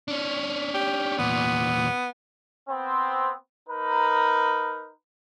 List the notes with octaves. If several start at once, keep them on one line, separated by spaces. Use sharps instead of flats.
C#4 D4
G4
E2 A#2 B3
B3 C4
D#4 A#4 B4